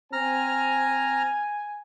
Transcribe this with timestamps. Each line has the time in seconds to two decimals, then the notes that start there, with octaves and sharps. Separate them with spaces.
0.13 C4 G#5 A#5 F6